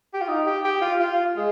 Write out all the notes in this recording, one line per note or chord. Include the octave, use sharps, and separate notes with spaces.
G4
F4
D#4
G4
G4
F4
F4
G#3